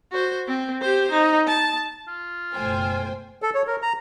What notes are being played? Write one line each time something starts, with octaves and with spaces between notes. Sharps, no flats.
F#4 C5
C4
G4 C5
D#4
A5
F4
F#1 B2 A3 C5 G5 G#5
A4
C#5
A#4
A#5